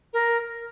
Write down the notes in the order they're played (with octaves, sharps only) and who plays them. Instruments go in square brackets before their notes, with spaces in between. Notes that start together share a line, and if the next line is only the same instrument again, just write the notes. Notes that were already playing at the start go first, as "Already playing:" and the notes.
[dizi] A#4